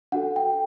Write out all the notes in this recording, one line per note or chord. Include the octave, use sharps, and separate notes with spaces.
D4 F#4 A4 F#5
G5